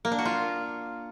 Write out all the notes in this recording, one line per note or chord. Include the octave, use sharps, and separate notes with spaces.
A#3
D4
F#4
F4